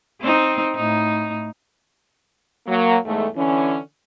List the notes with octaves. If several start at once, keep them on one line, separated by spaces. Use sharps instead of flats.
C4 D#4
A2 D#4
F#3 A#3
E2 G#2 G#3 A3
D3 E3 C#4